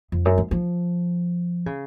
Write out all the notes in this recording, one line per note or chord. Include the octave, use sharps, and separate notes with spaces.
F2
F#2
F3
F3
C#3